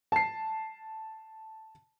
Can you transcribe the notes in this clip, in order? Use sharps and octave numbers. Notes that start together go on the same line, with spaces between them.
A5 C7